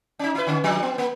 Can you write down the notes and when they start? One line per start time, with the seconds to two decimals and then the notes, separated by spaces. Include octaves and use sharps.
0.19 C#4 D#4
0.35 E4 B4
0.47 D3 C#4
0.64 F3 G3 D4
0.83 B3
0.98 A#3